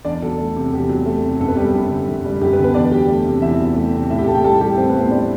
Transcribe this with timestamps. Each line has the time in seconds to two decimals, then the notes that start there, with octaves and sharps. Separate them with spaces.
0.05 E2 D4 D5
0.22 F#3 A4
0.39 A3
0.56 C3
0.73 E2 G4
0.89 F#3
1.06 A3
1.23 C3
1.40 F#2 A4
1.48 B3 B4
1.56 G3 G4
1.65 A4
1.74 F#2
1.90 D3
2.08 F#2
2.25 G3
2.41 F#2 G4
2.53 B3 B4
2.59 D3
2.64 B3 B4
2.74 E2 D4 D5
2.91 F#3 G4 G5
3.09 A3
3.26 C3
3.42 E2 E4 E5
3.60 F#3
3.76 A3
3.94 C3
4.10 A2 E4 E5
4.18 G4 G5
4.26 A2 A4 A5
4.35 G4 G5
4.44 G3 A4 A5
4.61 G3 G4 G5
4.77 A2 C4 C5
4.89 B3 B4
4.94 A2
4.99 C4 C5
5.11 G3 D4 D5